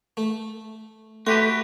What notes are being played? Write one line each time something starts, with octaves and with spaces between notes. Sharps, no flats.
A3
A3 F#4 G4 B4 C6